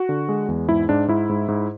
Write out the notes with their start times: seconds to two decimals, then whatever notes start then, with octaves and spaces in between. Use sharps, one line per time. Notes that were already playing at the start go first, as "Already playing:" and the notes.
Already playing: F#4
0.09 D3
0.29 G#3
0.48 E2
0.69 G#2 E4
0.89 G#2 D4
1.08 G#2 E4
1.29 G#2
1.48 G#2